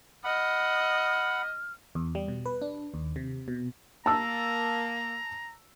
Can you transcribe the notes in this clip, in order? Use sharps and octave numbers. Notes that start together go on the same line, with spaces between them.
D#5 F#5 B5 F6
E2
G3
B2
B4
D4
D#2
C3
B2
A#3 A5 A#5 E6